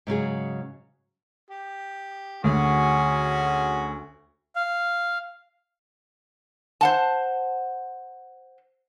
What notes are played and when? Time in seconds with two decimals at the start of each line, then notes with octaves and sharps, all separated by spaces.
0.07 G#2 C#3 F#3 G#4
1.50 G4
2.44 D2 C#4 F#4 G#4
4.56 F5
6.81 C5 F#5 A5